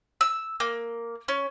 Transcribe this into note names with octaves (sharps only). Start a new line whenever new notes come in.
E6
A#3
C#4